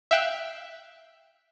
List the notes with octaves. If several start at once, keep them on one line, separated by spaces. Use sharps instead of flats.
E5 F5 G5 E6 F#6